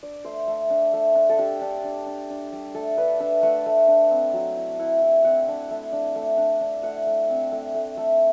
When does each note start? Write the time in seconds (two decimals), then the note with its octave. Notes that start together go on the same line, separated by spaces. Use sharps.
0.03 D4 D5
0.25 A3 C5
0.48 A3
0.70 D4
0.93 A3
1.15 D4
1.29 A4
1.38 D4 G4
1.61 D4
1.84 D4
2.06 D4
2.30 D4
2.52 G3
2.74 A3 A4
2.98 D4 B4
3.20 D4 E5
3.43 A3 F#5
3.66 A3
3.88 D4
4.11 C4
4.33 F#3
4.57 E4
4.79 E4 F#5
5.02 E4 G5
5.24 C4 F#5
5.48 D4
5.71 A3
5.93 D4
6.16 A3
6.38 D4
6.61 D4
6.83 A3 F#5
7.07 A3
7.29 C4
7.52 A3
7.75 A3
7.97 A3